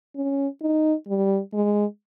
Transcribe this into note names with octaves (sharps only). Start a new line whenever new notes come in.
C#4
D#4
G3
G#3